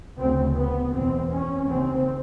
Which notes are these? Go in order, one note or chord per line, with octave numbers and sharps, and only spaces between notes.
D2 C#3 C4
B3
E2 B2 C4
C#4
D#2 C#3 C4